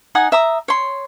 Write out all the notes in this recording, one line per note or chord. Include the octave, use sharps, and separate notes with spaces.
D#4 F#5 G#5 D#6
E5 A#5 D#6
C#5 C6